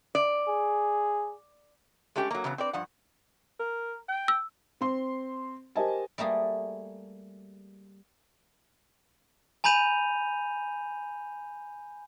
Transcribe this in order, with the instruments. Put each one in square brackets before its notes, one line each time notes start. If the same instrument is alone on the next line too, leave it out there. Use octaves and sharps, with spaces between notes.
[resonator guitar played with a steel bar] D5
[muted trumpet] G#4
[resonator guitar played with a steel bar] G#3 A3 C#4 G4
F#3 A#3
C#3 E3 F#3 A#3 B3
C4 B4 D5
G2 F3 F#5
[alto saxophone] A#4
G5
[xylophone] E6
[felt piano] C4 C6
G4 A#4 C5 D#5 G#5 A5
[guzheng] G3 A3 A#3 G#4
[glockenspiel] G#5 A#5 B5 G6 D#7 F7